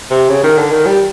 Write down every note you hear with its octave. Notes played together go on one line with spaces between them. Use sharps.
C3
C#3
D#3
D3
D#3
G3